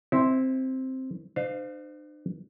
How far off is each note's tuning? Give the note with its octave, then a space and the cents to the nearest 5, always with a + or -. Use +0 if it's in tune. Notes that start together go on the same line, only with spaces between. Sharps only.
C4 +0 E4 -15
D4 +45 C5 -30 F5 +5